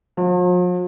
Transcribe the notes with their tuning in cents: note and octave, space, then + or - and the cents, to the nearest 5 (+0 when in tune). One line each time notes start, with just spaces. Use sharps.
F3 +45